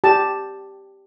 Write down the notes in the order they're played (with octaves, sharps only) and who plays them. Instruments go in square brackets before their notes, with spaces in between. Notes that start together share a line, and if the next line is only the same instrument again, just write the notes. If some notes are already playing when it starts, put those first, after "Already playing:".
[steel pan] G4 A5